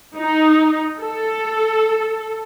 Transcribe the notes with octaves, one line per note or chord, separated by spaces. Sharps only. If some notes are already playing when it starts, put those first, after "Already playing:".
D#4
A4